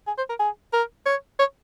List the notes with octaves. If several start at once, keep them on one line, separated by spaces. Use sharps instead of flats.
G#4
C5
A#4
G#4
A#4
C#5
C#5